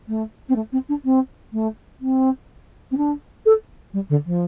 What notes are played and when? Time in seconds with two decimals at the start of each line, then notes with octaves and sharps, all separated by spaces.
0.08 A3
0.48 C4
0.55 A3
0.72 C4
0.89 D4
1.04 C4
1.52 A3
2.00 C4
2.91 C4
2.97 D4
3.45 A4
3.93 G3
4.09 D3
4.26 F3